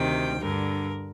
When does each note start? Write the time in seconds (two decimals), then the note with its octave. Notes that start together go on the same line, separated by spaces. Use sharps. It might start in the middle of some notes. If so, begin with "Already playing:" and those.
Already playing: D2 C3 D#3 G5
0.42 G2 D3 A#4